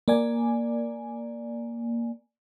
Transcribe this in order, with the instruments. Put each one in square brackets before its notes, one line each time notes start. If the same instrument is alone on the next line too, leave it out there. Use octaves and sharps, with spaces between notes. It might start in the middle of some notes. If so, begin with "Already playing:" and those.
[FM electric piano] A#3 D5 G#5